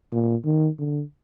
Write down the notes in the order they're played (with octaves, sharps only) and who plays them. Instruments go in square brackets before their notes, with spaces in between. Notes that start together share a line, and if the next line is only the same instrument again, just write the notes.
[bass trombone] A#2
D#3
D3